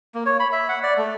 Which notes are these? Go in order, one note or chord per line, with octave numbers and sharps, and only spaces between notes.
A#3
C#5
B5
E5
F#5
D5
A3